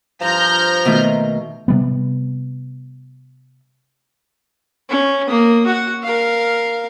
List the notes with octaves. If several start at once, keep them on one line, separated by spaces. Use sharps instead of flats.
G2 F3 A#5 F6 G6
B2 D#3 A3
C3 G3 B3
C#4
A#3 D#6
F#4 F#5
A#4 F5